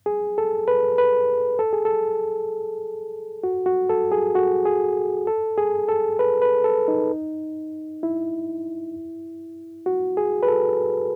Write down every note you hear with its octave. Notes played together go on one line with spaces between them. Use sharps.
G#4
A4
B4
B4
A4
G#4
A4
F#4
F#4
A4
G#4
F#4
G#4
A4
G#4
A4
B4
B4
A4
D#4
E4
F#4
G#4
B4
A4